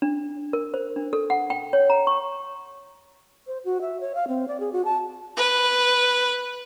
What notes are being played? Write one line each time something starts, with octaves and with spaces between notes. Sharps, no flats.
D4
A#4
C5
D4
A4
F#5
G5
C#5
A#5
C#6
C5
F#4
E5
C#5
F5
C4
D5
G#4
F#4
A5
B4